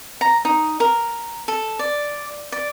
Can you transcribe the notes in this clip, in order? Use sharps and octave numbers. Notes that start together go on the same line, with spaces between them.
A#5
D#4
A#4
A4
D5
D5